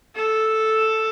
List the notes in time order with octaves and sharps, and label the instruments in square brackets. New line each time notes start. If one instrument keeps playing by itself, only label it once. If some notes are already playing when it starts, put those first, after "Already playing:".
[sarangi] A4